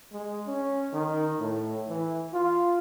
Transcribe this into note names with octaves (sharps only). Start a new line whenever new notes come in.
G#3
C#4
D#3
A2
E3
F4